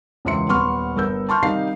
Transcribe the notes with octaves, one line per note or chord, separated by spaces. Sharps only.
E1 C#2 E5 C6 C#7
D#1 B3 C6 C#6 F6
G1 B3 A#4 E6 G6
A5 C6 C#6 F6 G6
C3 D#3 G3 D#4 F5 C7